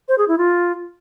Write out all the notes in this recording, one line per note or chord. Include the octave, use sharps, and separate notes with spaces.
C5
G#4
E4
F4